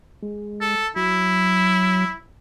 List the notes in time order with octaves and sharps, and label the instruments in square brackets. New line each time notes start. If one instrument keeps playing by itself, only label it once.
[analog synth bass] G#3
[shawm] A4
[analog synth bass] F#3 [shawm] E4